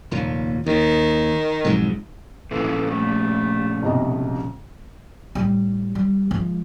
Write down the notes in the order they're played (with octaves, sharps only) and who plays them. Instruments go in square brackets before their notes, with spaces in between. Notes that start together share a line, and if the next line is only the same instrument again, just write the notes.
[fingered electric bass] F1 D#2 A#2
[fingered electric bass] D#2 [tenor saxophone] D#3
[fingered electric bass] B1 F2 G#2
[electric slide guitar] A#2 C#3 F3 [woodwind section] E3 A4
[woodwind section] G3 A3
[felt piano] B1 C3 D#5
[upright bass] A2 G3
G3
F3 G#3